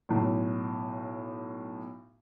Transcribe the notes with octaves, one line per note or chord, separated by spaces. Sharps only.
B1 A2